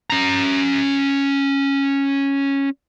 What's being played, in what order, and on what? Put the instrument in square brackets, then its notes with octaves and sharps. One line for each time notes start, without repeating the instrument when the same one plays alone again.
[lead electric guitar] C#4 A#5